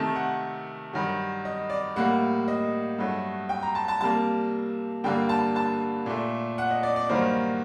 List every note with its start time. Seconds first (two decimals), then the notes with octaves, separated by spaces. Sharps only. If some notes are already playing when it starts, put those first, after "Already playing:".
Already playing: C3 D#3 A3 A5
0.16 F#5
0.93 G2 D#3 F#3
1.45 D#5
1.70 D5
1.96 A2 G3 A#3 F#5
2.48 D#5
2.99 G2 F#3 A3
3.49 G5
3.63 A#5
3.75 A5
3.88 A5
4.01 C3 G3 A#3 A5
5.04 G2 D3 G3 A#3 G5
5.29 A5
5.56 A5
6.06 A#2 A3
6.58 F#5
6.70 D#5
6.83 D5
6.96 D5
7.09 G2 D#3 F#3 A#3 C5